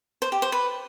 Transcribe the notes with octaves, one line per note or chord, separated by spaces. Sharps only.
C5
G4
C5
B4